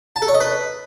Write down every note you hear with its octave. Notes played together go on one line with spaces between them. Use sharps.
A5
A4
C#5
D#5
B4